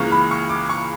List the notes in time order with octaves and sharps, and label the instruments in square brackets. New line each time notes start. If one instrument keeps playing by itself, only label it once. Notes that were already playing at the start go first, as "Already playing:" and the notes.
Already playing: [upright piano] C#2 C#3 E3 A#3 C#6
B5
C#6
D6
C#6